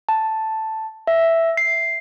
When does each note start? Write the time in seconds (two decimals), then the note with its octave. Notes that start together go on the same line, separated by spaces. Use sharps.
0.09 A5
1.07 E5
1.57 C7